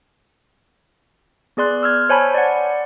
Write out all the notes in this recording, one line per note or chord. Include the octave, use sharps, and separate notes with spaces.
B3 G#4 D5 C6 F#6
E6 F6 G#6
C5 C#5 G#5 A5 B5
D5 F#5